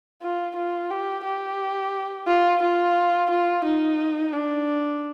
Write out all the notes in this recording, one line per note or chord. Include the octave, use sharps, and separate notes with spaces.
F4
F4
G4
G4
F4
F4
F4
D#4
D4